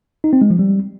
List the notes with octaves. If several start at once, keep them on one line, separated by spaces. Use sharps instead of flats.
D#4
C4
G#3
F3
G3